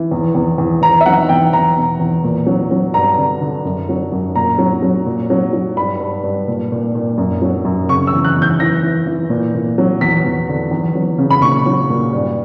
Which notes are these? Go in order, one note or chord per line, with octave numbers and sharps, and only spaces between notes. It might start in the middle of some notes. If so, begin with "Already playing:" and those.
Already playing: E3
E2
E2
E2
E2 A#5
E5
F#3 F#5
E2 G5
E2 A#5
B2
E2
A#2
F#3
F#3
G2 A#5
D3
D3
F#2
F#3
F#2
A#2 A#5
F#3
F#3
A#2
F#3
F#3
G2 B5
G2
G2
A#2
A#2
A#2
F#2
F#3
F#2
C#3 C#6
E6
E2
F#6
E2
G6
E3 A#6
E3
E3
A#2
A#2
F#3
E2 B6
E2
D3
E2
F#3
C#3
B5
A#2 C#6
F#3
A#2
G2